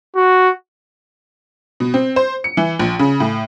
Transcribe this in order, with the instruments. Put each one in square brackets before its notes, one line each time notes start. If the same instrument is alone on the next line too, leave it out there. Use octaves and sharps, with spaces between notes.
[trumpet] F#4
[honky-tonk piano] B2
C4
C5
C#7
E3
A#1
C#3
A2